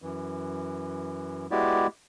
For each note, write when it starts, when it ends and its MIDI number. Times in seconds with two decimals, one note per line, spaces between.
0.02 1.47 42
0.02 1.47 52
1.51 1.87 56
1.51 1.87 59
1.51 1.87 64
1.51 1.87 66
1.51 1.87 67
1.51 1.87 74